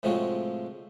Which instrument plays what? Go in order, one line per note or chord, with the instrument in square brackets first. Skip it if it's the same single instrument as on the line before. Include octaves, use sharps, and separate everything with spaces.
[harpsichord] A2 C3 F3 G#3 F4 F#4